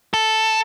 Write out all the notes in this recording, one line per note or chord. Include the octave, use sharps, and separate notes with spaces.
A4